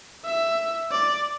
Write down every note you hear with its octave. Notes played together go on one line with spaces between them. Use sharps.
E5
D5